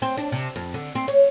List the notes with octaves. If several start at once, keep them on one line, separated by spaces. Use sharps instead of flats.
C4
D4
C3
F2
D3
C4
C#5